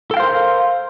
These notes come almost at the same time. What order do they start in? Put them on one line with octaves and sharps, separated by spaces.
A4 G5 F5 C5 A#4